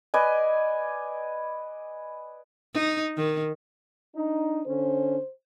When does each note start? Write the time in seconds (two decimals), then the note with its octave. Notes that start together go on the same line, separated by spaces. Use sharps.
0.14 B4 D5 D#5 G#5
2.74 D#4
3.17 D#3
4.15 D4 D#4
4.66 D3 C#4 C5